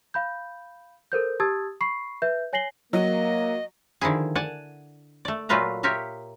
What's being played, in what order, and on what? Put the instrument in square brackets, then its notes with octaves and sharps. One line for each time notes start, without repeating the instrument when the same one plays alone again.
[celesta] F5 B5 G6
A4 A#4 C5 G6
G4 A5 D#6 E6 G#6 A6
B5 C#6 C7
B4 E5 G6
C#5 G#5 A#6 C7 F#7 G7
[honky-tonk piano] F#3 [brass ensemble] A#3 [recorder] D#5
[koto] D3 D#3 F3 E4 G#4
D5 F#5 G#5 A5
A3 D5
A#2 F#3 A3 F4 B4 A#5
F4 G4 A#4 C#5 E5